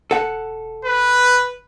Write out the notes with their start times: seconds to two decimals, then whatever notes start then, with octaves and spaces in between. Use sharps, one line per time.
0.11 E1 A4 F#5
0.85 B4